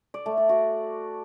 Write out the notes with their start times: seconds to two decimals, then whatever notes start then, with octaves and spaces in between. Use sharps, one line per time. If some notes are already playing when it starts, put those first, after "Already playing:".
0.14 D5
0.26 A3
0.37 D5
0.49 F#4